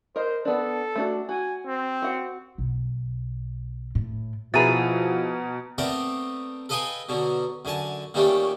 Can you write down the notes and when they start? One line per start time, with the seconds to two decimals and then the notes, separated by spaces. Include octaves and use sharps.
0.16 A#4 C5 D#5
0.45 B3 D4 A4
0.95 A3 D4 F#4
1.29 F#4 G#5
1.67 C4
2.02 F#4 F#5
2.58 B1
3.95 A2
4.54 B2 F3 E4 G#4 B4 A#5 A6 D#7
5.78 A3 B3 C4 A#4 C5 D5
6.69 A4 B4 D#5 F5 G5 G#5
7.09 B2 D3 F#3
7.65 F#2 D3 G#5 A5
8.14 A#2 D#3 G3 A3 C#4 G4